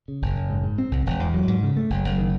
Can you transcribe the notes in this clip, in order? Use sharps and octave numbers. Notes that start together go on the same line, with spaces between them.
C#3
F#1
F#1
G#2
G#2
C4
C2
E1
E2
F#3
G#2
C#3
A3
F#1
F#1
D#3